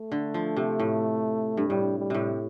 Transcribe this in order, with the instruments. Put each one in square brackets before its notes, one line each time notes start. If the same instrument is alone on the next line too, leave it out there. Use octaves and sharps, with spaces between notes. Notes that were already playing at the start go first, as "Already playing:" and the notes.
Already playing: [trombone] A3
[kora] D3
F3
C3
A2
G2
[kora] A2 [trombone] G3
[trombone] G3
[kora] A2 C3